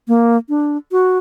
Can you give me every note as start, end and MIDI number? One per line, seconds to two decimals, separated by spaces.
0.08 0.37 58
0.49 0.77 62
0.92 1.18 66